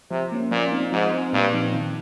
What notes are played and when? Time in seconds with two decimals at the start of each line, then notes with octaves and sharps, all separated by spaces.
0.11 C3 F3
0.32 A#3 C#4
0.51 A#2 F3
0.72 C4 D#4
0.92 G#2 F3
1.13 C4 D#4
1.33 G2 A#2
1.53 F3 C4 D#4
1.74 D#3